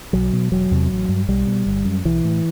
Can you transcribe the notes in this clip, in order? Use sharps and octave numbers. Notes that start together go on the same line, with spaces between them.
B1 F#3
B2
E1 F#3
E2 C3
A1
G2
B1 G3
B2
G1
F#2
B1 E3
A2